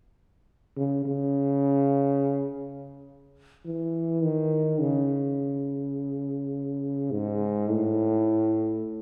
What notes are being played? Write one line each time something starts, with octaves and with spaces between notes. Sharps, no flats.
C#3
C#3
E3
D#3
C#3
G#2
A2